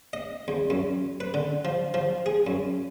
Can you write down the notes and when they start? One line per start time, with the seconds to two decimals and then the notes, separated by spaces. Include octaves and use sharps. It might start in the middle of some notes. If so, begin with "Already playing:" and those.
0.13 D#5
0.48 E2
0.70 F#2
1.20 B4
1.34 D3
1.65 F3
1.94 F3
2.26 G#4
2.47 F#2